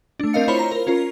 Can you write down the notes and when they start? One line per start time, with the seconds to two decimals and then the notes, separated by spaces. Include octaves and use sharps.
0.20 A3 D4
0.33 C4 A#4 D#5 F5 C#7
0.48 E4 F4 C5 C#5 A#5 B5
0.59 A#5
0.71 A#4 C5
0.87 C#4 F4 A#4